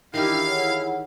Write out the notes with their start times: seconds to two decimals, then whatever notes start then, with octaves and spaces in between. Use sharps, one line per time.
0.14 D#3 E3 D4 E4 G4 F5
0.46 G#4 C#5 F#5